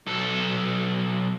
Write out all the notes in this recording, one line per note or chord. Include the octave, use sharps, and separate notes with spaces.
B1 A4